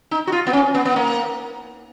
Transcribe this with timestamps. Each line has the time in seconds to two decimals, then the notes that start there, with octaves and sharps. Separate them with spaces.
0.11 D#4
0.27 F#4
0.32 F4
0.47 B3
0.53 C#4
0.75 B3
0.85 B3
0.96 A#3